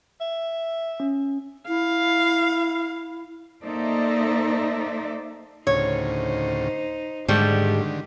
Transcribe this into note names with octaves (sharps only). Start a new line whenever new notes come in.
E5
C#4
E4 F5
A#3 D#4 A4 C5 D5 E5
D2 A2 C#3 D#4 C5 C#5
G#2 D3 D#3 G3 A3 G4